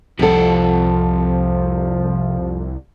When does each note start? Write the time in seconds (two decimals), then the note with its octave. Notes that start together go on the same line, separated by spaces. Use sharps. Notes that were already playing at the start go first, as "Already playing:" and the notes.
0.19 C2 F2 C3 F3 A4 F#5